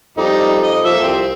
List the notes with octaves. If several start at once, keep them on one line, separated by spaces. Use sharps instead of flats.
F2 G3 D#4
D#5
F3 A#3 E5 E6
C2 C4